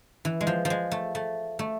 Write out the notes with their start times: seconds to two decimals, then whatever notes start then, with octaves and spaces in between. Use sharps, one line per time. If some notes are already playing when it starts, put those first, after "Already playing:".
0.25 E3
0.41 G#3
0.47 F3
0.65 F3
0.70 G#3
0.91 A3
1.15 A3
1.59 A3